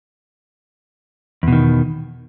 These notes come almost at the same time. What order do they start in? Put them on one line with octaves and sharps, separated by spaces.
E2 B2 D#3